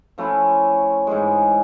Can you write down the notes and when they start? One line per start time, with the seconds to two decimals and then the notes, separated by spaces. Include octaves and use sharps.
0.18 F3 A3 C#4 E4
1.07 G#2 E3 G#3